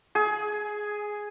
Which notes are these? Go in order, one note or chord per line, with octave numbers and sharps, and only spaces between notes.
G#4